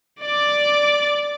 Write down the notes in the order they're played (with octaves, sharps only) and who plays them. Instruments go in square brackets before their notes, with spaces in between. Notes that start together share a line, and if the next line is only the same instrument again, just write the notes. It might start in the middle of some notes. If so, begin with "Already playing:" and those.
[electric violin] D5 D6